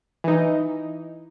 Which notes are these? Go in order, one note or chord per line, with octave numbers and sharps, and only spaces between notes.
E3 D#4